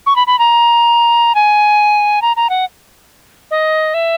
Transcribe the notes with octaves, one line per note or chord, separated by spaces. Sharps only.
C#6
B5
B5
A#5
G#5
A#5
A#5
F#5
D#5
E5